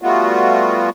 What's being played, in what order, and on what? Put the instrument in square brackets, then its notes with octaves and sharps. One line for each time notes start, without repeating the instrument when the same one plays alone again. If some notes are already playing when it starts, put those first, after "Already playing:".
[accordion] G3 A3 B3 F4 F#4